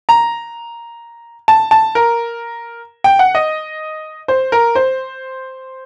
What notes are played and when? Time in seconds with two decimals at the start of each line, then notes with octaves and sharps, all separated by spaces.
0.09 A#5
1.48 A5
1.71 A5
1.95 A#4
3.04 G5
3.19 F#5
3.35 D#5
4.28 C5
4.52 A#4
4.75 C5